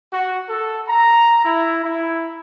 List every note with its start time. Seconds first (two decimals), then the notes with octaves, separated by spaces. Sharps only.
0.13 F#4
0.49 A4
0.87 A#5
1.44 E4
1.83 E4